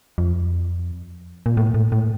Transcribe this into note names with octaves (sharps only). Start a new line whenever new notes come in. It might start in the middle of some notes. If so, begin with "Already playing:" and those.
F2
A#2
A2
A2
A2